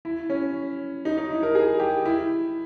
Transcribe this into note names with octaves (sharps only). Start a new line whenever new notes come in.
E4
C#4
D#4
D#4
E4
A#4
G#4
G4
E4